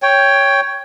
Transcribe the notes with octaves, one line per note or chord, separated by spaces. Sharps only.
C#5 G5